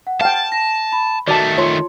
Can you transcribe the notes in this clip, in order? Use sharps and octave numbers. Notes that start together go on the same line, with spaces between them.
F#5
F5 G5 A5
A#6
B5
D#3 A3 F#4 D5 A5 A6
F4 C#5 C6